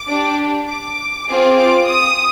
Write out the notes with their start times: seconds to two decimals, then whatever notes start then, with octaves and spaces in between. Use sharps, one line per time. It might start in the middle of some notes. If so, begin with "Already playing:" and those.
Already playing: D6
0.08 D4 G4
0.68 D6
1.27 C4 F4 G#4
1.57 D6
1.87 D#6